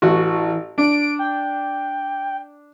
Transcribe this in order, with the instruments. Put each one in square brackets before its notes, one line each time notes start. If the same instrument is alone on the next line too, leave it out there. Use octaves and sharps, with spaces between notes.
[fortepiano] A1 F#4 [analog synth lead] E3
[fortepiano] D4 [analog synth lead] D7
[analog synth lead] G5